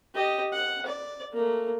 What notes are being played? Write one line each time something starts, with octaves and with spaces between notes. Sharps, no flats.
G4 D#5
F#5
D5
A3 A#3